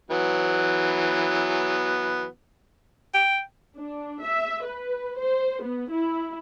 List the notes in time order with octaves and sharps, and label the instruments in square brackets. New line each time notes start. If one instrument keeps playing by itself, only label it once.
[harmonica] E3 F#3 B3
[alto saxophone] G5
[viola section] D4
E5
B4
C5
B3
E4